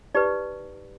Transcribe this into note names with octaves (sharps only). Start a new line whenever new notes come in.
D#4 G4 B4 D5